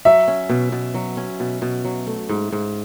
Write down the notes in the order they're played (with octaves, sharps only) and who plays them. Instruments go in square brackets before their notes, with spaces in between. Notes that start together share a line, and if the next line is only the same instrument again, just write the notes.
[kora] F#3 [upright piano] E5
[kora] C#4
B2
B2
F#3
C#4
B2
B2
F#3
A3
G#2
G#2